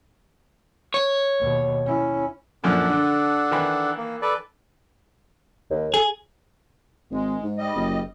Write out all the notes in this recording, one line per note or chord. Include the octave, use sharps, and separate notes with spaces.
C#5
D#2 B2
C#4 E4
F#2 A#2 F3 D4 A4 F#5
D3
D#3 E3 B5
A#3
A4 B4 D5
D#2
G#4 A4
G#1 G#3
G#2
G3 D#5
F#1